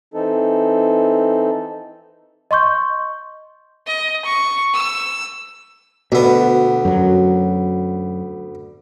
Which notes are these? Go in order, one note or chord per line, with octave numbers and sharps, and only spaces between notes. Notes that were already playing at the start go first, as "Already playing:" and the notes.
E3 C4 D#4 A4
D#5 C6 C#6 G6
D#5
C#6
E6
D2 B2 B3
F#2 F#3